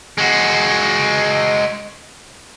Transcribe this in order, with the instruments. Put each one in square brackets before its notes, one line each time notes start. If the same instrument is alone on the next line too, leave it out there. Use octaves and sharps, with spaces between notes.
[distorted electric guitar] G#3 F#4